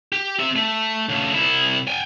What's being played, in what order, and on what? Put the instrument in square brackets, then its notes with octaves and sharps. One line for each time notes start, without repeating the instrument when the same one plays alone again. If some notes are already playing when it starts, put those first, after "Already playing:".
[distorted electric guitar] G4
C4 E5
A3
C#3 A3
C2 E4
G5 G#5